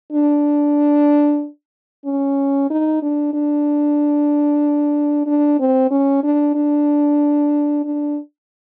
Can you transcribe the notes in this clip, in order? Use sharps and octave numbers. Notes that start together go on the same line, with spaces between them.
D4
C#4
D#4
D4
D4
D4
C4
C#4
D4
D4
D4